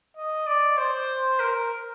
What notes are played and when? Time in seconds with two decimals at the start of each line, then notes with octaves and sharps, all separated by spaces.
0.17 D#5
0.47 D5
0.78 C5
1.40 A#4